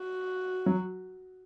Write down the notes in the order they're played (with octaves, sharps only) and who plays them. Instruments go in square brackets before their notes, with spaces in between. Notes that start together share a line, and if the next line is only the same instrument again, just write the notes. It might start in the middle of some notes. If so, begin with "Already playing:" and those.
Already playing: [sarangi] F#4
[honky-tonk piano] F#3